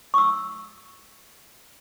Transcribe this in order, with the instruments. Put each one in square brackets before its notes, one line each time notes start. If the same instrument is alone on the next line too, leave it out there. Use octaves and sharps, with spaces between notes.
[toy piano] C#6 E6